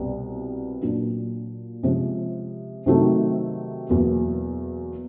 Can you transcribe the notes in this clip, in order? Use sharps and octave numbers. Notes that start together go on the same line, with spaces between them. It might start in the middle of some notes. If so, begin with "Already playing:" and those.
Already playing: C2 B2 G3 B3
A#2 F#3 A#3 D4
C3 F3 G#3 C#4
C3 D#3 F#3 A3 C4
E2 B2 F#3 A#3